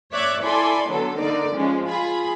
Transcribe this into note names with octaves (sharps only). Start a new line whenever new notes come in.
C#5 D5 E5 D6 F#6 G#6
E4 A4 D5 G#5 B5 C6
D3 F#3 B3 A4
D3 A#3 D#4 D5
F3 G#3 C#4
F4 G#4 B5